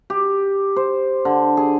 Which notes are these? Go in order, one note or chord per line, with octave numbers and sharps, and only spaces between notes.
G4
C5
D3
G#4